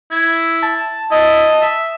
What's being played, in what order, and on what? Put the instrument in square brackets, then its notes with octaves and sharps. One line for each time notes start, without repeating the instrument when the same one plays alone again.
[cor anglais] E4 [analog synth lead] G#6
[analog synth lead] A5
[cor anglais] E4 [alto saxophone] D#5
[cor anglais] E5